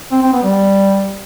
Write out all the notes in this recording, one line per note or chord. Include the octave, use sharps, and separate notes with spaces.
C4
C4
B3
G3